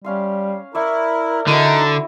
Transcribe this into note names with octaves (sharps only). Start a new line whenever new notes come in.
G3 C#4 F5 C6
E4 A#4 D5 E5 C#6
D3 D#4 E4 F#4 E5